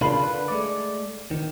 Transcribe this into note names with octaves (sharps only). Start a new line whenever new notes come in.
C#3 D4 F4 A#4 B5 C7
D3 B4
G#3 A3 D5
D#3